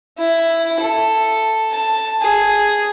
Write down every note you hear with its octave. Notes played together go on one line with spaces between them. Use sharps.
E4
A4
A5
G#4